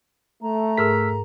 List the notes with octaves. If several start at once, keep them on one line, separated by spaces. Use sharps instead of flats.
A3 A#5
G#2 G#4 A#4 E6 F6 B6